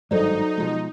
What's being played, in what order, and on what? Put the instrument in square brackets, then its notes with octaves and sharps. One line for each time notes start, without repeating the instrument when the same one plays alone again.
[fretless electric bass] G#1 G2 G#3 [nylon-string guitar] F#3 [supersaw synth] D#4 [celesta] A4 C5 D5
[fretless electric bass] B2 F3 G#3